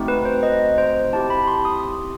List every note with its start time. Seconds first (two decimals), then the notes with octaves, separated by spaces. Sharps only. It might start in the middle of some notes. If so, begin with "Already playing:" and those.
Already playing: A3 C4 D#4 F#4
0.08 B4
0.25 C5
0.43 D#5
0.78 C5
1.13 C4 E4 G4 A5
1.30 B5
1.48 C6
1.65 D#6